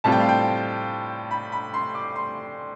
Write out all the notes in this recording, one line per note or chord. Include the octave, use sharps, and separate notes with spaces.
A2 G3 C4 F4 A5
G5
F5
G5
B5
B5
C6
D6
C6